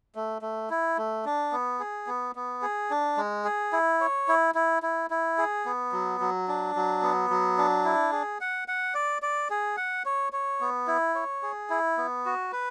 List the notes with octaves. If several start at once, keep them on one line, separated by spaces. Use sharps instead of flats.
A3
A3
E4
A3
D4
B3
G#4
B3
B3
G#4
D4
G#3
G#4
E4
C#5
E4
E4
E4
E4
G#4
B3
F#3
F#3
D4
F#3
B3
F#3
D4
E4
G#4
F#5
F#5
D5
D5
G#4
F#5
C#5
C#5
B3
E4
C#5
G#4
E4
B3
F#4
B4